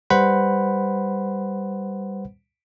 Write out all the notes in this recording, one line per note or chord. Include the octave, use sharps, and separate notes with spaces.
G3 B4 C5 F#5 B5